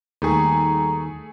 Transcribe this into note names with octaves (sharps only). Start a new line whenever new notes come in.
D#2 G3 A3 G#4 A#5 C#6